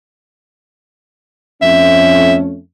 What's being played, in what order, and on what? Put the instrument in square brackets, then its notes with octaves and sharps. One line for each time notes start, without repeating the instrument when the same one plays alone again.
[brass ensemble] F2 A3 C#4 [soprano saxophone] E5